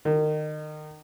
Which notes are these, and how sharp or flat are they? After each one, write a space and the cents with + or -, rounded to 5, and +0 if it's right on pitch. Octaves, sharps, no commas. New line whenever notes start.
D#3 -30